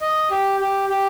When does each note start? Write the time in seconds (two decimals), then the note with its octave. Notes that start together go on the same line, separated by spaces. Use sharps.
0.01 D#5
0.31 G4
0.60 G4
0.89 G4